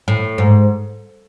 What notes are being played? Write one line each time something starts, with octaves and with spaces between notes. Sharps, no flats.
A2
G#2